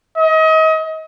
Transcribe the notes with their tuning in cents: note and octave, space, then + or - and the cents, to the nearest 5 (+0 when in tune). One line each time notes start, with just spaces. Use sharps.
D#5 +35